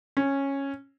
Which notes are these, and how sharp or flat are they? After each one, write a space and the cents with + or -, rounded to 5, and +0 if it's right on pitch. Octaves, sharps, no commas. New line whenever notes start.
C#4 -10